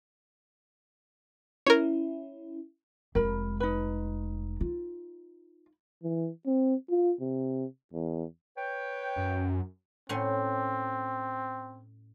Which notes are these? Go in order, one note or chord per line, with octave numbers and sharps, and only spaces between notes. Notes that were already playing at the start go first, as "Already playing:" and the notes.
C#4 E4 A#4 C#5
F1 G#3 A#4 B5
D#4 B4
F4
E3
C4
F4
C3
E2
B4 C#5 G5
F#2
A2 C4 C#4 C6